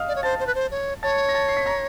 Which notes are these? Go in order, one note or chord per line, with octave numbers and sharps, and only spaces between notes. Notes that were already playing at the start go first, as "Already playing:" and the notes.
Already playing: D#5 F5 D#6 F6
D5
C#5
C5 A5 A6
C5
B4
C5
C#5
C#5 A5 A6
A#6
A5 A6
C7
B6
A#5 A#6